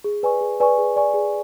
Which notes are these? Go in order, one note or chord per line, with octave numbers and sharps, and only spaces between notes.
G#4
B4 D5 G#5 C#6
G#4
B4 D5 G#5 C#6
G#4
B4 D5 G#5 C#6
G#4